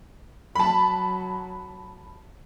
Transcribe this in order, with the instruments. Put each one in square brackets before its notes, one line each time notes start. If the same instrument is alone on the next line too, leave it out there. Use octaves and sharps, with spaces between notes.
[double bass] F#3 [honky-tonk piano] A5 B5